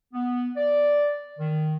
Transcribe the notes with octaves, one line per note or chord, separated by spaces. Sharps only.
B3
D5
D#3